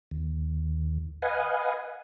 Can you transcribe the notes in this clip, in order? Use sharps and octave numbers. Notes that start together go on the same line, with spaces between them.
D#2
B4 D#5 F5 F#5 G#5